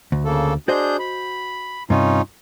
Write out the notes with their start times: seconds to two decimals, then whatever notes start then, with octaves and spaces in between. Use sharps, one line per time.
0.12 D2
0.25 C#3 A#3 A4
0.68 D4 F#4 G#4 C5 D#5 G6
0.99 B5
1.90 G2 C3 C#4 D#4 F4